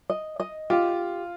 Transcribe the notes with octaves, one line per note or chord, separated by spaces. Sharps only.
D#5
D#5
F4 G4